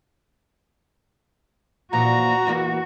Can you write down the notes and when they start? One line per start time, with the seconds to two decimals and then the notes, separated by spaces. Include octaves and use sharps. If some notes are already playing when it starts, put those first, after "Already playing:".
1.93 A#2 E3 F3 F#4 A#5
2.47 E2 E3 A#3